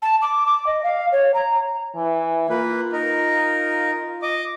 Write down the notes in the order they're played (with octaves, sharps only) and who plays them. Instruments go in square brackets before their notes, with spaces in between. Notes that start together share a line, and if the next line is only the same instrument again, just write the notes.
[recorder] A5
D6
D6
D#5
F5
C#5
A#5
[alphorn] E3
[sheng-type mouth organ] A#3 B4 [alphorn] F4
[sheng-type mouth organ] D#4 A#4
D#5 D6